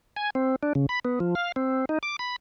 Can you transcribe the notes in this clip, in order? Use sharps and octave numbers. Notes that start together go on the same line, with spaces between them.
G#5
C4
D4
C#3
B5
B3
F3
F5
C4
D#4
D6
B5